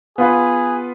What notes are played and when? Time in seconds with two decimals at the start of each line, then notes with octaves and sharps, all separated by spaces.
0.18 B3 F4 G#4 B4